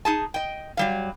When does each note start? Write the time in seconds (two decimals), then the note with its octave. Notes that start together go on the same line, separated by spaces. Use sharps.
0.05 D#4 G#4 A5
0.34 D#5 G5
0.77 F#3 G3 F5